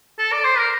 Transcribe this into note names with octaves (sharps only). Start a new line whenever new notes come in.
A4
D5
C5
A#4